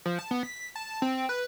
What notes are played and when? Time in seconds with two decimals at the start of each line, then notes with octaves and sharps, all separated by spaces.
0.05 F3
0.19 A5
0.31 B3
0.43 B6
0.76 A5
1.02 C4
1.29 B4